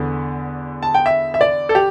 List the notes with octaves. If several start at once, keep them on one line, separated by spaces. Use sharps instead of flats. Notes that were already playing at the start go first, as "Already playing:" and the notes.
Already playing: E2 D3 B3
A5
G5
E5
E5
D5
A4
G4